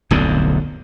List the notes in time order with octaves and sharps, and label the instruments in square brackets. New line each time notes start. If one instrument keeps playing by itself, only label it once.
[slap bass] D1 B1 F2 D3